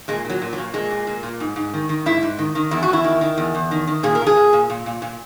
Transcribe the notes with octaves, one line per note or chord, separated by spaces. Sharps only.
A#2 G#3
A#2 F#3
A#2
F#3
A#2
A#2 G#3
A#2
A#2
A#2
G#2
G#2
D#3
D#3
G#2 E4
G#2
D#3
D#3
E2 E4
F#4
E2 E4
D#3
D#3
E2
E2
D#3
D#3
A#2 G#4
A#4
A#2
G#4
A#2
A#2
A#2
A#2
A#2